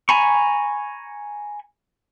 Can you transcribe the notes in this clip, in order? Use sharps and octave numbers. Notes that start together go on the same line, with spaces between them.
G#5 A#5 B5 C#6